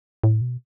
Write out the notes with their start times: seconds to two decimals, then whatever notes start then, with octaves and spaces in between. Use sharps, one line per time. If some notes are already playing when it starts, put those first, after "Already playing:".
0.24 A2
0.41 B2